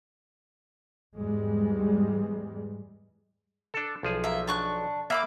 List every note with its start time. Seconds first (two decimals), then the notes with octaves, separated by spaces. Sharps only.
1.16 E2 G#2 G3 G#3
3.74 D4 A4
4.03 B1 F3 G#4
4.24 A#3 E5
4.47 D4 C#6 F#6
5.10 A#3 E5 B5 D6